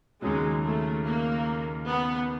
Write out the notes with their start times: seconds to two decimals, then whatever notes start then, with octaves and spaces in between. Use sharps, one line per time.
0.22 D#2 C#3 F#3 G#3
0.63 A3
1.05 A#3
1.87 B3